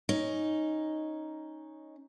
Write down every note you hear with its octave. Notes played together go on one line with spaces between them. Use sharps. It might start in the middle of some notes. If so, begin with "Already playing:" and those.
C#4 D#4